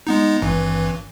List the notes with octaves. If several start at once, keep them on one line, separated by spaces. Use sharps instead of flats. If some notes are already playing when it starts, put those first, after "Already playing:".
G#3 B3 D#4
G#1 G2 E3